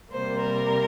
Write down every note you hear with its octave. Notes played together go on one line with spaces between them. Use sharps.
C3 G3 A#3 C5
A#4